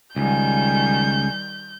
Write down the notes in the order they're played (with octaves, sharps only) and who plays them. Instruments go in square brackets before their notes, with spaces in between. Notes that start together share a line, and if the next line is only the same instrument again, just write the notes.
[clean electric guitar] C#2 [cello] D#3 G3 [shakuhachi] G#5 [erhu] G6